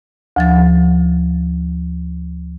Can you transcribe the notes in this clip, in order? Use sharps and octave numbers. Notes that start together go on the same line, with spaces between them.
D2 F3 A6